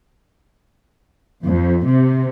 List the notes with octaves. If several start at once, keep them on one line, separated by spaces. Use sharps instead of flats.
F2
C3